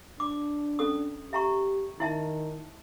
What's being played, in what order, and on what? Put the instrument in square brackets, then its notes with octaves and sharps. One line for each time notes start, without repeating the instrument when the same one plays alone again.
[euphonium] D4 [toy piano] D6
[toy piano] C#4 A4 D#6
[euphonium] G4 [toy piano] E5 A#5 C#6
[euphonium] D#3 [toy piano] E4 E5 A5